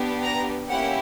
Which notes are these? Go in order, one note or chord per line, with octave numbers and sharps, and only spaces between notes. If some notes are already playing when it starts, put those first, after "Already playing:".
Already playing: B3 D4 G4
A#5
A#3 C#4 E4 G4 F#5